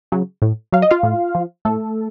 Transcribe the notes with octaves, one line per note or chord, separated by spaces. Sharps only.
C#3 F#3
A2
F#3 F5
D#5
F4 F5
A2
F3
A2 A3 A4